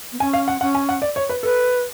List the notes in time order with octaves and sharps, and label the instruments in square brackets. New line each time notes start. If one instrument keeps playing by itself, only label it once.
[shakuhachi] B3
[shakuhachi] C#4 [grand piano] G#5
[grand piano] F5
F#5
[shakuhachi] C#4 [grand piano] F#5
[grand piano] G#5
F#5
D5
C#5
B4
[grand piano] A4 [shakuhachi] B4